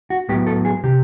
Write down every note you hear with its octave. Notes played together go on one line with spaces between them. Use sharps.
F#4
A2 F#3 B3 G4
A4
G#4
C3 G4